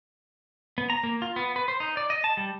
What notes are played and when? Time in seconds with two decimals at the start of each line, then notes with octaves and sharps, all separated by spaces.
0.78 B3
0.90 A#5
1.03 A#3
1.22 F4
1.36 B3
1.56 B4
1.68 C5
1.80 D#4
1.97 D5
2.10 D#5
2.24 A5
2.37 G3